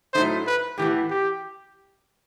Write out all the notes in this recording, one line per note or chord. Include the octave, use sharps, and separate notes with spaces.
A2 F#3 A3 D#4 C5
B4
A2 E3 B3 G4
G4